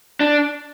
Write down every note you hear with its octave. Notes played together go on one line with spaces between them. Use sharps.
D4